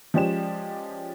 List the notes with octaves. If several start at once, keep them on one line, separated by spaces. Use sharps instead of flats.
F3 G#3 C#4 G4 D5 E7